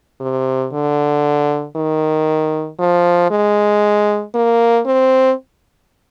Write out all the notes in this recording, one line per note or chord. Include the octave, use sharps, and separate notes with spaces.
C3
D3
D#3
F3
G#3
A#3
C4